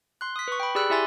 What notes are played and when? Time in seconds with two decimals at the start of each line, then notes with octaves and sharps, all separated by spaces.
0.21 C6 F#6
0.36 D#6 B6
0.48 B4 C#6
0.60 G5 B5
0.75 G4 G#4 D5 B5 E6 F#6
0.90 E4 G4 E5 G#5 C6 A6